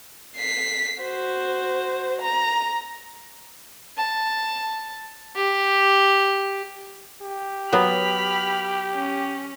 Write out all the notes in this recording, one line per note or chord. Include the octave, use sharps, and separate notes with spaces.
B6 C7
F#4 C5
A#5
A5
G4
G4
F#3 B3 B5 F6
C#4